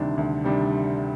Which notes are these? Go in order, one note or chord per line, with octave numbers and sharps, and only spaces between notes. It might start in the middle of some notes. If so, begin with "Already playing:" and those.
Already playing: D2 C3 D#3 G3 D4
D2
C3 D#3 G3 D4